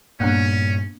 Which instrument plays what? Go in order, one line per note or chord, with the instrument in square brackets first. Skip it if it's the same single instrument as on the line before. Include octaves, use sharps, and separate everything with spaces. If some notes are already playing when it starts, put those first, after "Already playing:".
[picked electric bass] G2 A#2 [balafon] A#3 B3 D4 [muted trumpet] C#4